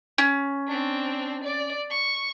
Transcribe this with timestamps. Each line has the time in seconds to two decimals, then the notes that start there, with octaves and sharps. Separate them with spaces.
0.18 C#4
0.68 C4 D4
1.43 D5
1.90 C#6